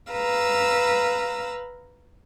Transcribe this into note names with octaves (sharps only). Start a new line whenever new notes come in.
B4 F5 A#5 E6